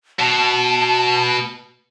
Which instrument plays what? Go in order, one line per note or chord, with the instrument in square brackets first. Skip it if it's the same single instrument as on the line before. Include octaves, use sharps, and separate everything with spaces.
[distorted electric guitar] B2 [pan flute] A5